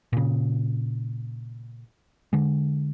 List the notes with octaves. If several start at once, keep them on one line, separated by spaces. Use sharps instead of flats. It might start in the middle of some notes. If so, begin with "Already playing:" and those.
A#2 C#3
D3 G#3